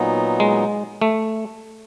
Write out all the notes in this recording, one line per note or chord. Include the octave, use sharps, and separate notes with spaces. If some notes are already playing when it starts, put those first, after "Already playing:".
Already playing: A#2 F#3 B3 D#4
G#3
A3